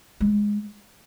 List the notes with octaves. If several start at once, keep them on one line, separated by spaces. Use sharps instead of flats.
G#3